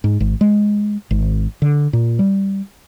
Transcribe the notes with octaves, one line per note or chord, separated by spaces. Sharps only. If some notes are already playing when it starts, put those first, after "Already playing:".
G#2
G#1
G#3
G#1
D3
A#2
G3